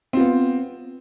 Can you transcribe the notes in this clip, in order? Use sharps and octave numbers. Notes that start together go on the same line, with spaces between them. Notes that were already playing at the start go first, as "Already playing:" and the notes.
B3 C4 F4